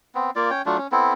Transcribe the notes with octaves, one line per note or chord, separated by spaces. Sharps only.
B3 C4
A#3 F4 D5
C#4 C#5 G5
F#3 A3 D4 F4
C#4
B3 C4 E4 A4